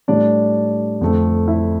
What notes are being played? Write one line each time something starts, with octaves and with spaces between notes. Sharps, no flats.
A2 G3 D4 D5
F2 D3 A3 C4
E4 E5